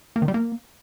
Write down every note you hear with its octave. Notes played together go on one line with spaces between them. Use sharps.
A#3
D#3
G3
A#3